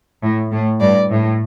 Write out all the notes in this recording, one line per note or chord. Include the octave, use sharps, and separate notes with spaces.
A2
A2
G2 D5
A2